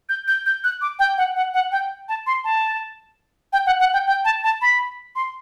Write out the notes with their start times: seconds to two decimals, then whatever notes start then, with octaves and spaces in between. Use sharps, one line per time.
0.09 G6
0.28 G6
0.46 G6
0.64 F#6
0.81 D6
0.99 G5
1.18 F#5
1.36 F#5
1.54 F#5
1.72 G5
2.09 A5
2.27 C6
2.44 A5
3.53 G5
3.66 F#5
3.80 F#5
3.93 G5
4.07 G5
4.25 A5
4.44 A5
4.61 B5
5.16 C6